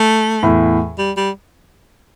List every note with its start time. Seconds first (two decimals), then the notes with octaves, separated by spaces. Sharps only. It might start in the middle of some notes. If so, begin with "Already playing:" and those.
Already playing: A3
0.43 E2 A2
0.98 G3
1.17 G3